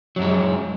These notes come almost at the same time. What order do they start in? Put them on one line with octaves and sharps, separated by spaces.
F#3 F#2 G#3